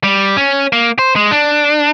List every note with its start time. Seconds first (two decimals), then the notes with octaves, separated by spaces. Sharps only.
0.04 G3
0.37 C#4
0.73 A#3
0.99 C5
1.16 G#3
1.31 D4